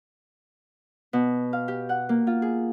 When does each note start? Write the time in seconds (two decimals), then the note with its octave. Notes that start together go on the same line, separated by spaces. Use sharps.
1.13 B2
1.53 F5
1.68 G4
1.89 F#5
2.09 A#3
2.27 F4
2.42 G#4